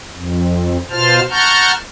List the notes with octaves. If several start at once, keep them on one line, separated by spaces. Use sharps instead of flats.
F2
B2 F4 C5 A5 F6
F#5 A5 A#5 C#6 F6 G6